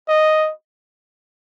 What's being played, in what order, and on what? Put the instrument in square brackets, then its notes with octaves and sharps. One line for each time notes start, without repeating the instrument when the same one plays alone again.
[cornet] D#5